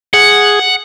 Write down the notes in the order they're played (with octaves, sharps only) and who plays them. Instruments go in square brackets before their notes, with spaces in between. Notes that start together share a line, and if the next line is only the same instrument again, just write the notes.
[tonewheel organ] G#4 [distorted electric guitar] F#5